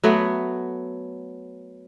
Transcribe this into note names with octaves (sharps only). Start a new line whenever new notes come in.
F#3 A3 B3